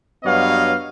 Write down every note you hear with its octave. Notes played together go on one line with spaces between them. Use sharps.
G2 F#3 B3 C#5 D#5 F5